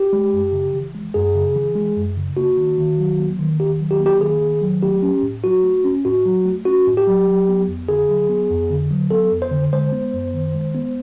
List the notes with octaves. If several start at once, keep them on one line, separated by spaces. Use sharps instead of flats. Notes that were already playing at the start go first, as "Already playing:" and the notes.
Already playing: G4
G#3
F#2
C#3
E3
G#3
F#2 G#4
C#3
E3
G#3
F#2
C#3
A#3 F#4
D#3
D#3
F#3
A#3
D#3
D#3 G4
F#3
G4
A#3
G4
D#3 G#4
D#3
F#3
A3 G4
C#4
A2
F#3 F#4
A3
C#4
A2 F#4
F#3
A3
C#4 F#4
A2
G4
F#3
F#3
B3
F2
D3 G#4
F#3
B3
F2
D3
F#3
B3 A4
F2
C5
D3
G#3 C5
B3
F#2
D#3
G#3
B3